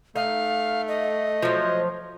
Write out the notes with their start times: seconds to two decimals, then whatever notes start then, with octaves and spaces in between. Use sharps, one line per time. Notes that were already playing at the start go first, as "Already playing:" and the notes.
0.16 A3 D#4 F5
0.88 D#5
1.43 F3 F#3